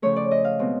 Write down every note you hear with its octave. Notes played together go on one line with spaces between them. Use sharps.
C#3 F3 A3 C#5
D5
D#5
F5
B2 G#3 C4